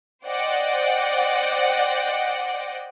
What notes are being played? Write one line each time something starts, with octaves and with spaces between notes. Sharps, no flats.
C5 D5 D#5 F#5 G5